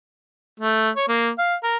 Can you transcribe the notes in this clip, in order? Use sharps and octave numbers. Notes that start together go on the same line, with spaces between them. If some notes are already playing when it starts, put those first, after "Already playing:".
A3
C#5
A#3
F5
A#4